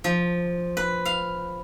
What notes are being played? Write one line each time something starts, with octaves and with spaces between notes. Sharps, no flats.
F3
B4
F5